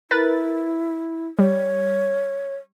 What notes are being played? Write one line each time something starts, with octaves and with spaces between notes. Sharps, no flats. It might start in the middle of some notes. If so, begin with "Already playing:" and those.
E4 A#4 B4 A6
G3 C#5